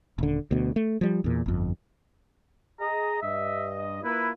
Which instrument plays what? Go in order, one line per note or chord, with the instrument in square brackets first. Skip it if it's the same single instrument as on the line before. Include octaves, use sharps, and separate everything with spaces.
[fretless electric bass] D#1 D3
D2 B2
A3
F3 G3
E2 A#2
G1 F2
[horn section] G#4 D#5 [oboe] A#5
[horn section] G2 D#5 [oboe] E5
[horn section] A#3 F4 B4 [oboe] E4